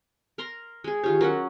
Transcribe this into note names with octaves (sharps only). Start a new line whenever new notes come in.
A#4 A#5 C6
G#3 G#4
D#3 F4 G4 C#5
F#3 C#4 A#4 F#5